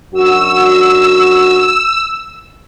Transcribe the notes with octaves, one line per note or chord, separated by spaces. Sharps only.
F#2 D4 F#4 E6